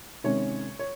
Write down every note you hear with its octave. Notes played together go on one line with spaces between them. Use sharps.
C3 D#3 G#3 C#4 C#5
C#5